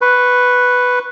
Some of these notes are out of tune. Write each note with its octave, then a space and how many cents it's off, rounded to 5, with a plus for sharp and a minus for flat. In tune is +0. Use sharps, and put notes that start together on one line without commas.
B4 +5 C#6 -20